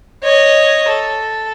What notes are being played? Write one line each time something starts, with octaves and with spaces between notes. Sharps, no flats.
C#5 D#5
A4